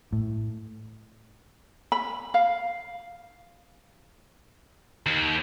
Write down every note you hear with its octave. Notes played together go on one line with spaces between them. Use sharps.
A2
B5
F5
D#2